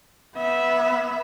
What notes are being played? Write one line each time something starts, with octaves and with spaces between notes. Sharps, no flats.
B3 E5